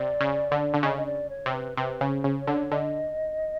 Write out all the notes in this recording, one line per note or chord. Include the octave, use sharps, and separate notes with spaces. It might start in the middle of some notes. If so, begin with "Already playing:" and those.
Already playing: C3 D5
C#3
D3
D3
C#3 D#5
D#5
D5
C#5
C3
B4
C3 B4
C#3
C5
C#3
C#5
D3
D3 D#5